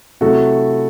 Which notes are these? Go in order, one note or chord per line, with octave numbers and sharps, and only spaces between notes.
C3 F#3 A3 E4 F#4 A4